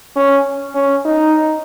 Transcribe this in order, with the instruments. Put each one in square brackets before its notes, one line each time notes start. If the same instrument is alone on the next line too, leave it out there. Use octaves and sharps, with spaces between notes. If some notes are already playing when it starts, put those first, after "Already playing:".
[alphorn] C#4
C#4
D#4